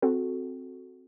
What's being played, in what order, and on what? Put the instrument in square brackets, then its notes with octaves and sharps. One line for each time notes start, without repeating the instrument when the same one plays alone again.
[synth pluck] C4 F#4 A4